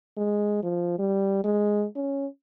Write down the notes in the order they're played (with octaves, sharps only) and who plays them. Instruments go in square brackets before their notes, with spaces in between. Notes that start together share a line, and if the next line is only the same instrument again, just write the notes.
[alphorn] G#3
F3
G3
G#3
C#4